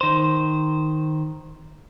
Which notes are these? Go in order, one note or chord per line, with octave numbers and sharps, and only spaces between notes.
D#3 C5